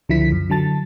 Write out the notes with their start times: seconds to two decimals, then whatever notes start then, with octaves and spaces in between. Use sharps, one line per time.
0.09 C#2 D3 F3 E4 B6
0.32 F#2
0.50 D3 F#3 A5 A6